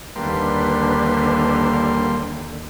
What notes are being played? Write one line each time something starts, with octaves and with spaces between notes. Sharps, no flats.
D#2 D3 G3 A#3 D4 B4 C6